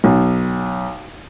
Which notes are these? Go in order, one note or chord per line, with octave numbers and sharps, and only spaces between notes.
B1